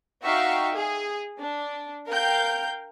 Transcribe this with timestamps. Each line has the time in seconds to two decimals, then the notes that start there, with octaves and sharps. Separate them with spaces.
0.24 D#4 F#4 E5 F5 G5 C#6
0.73 G#4
1.38 D4
2.08 A#4 F5 G5 G6